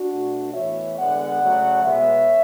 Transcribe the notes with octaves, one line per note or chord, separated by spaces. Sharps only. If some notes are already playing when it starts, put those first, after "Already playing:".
Already playing: D4 F#4
B2 A3
A2 E3 B3 C#5 E5
D3 G#3 B3 D5 F#5
C#3 F#3 A3
B2 G#3 B3 C#5 E5